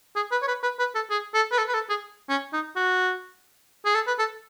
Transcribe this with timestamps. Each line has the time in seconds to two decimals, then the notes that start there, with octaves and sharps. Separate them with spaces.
0.16 G#4
0.32 B4
0.42 C#5
0.48 B4
0.63 B4
0.79 B4
0.95 A4
1.10 G#4
1.34 A4
1.52 B4
1.58 A4
1.68 B4
1.74 A4
1.89 G#4
2.29 C#4
2.53 D#4
2.76 F#4
3.85 G#4
3.95 A4
4.07 B4
4.19 A4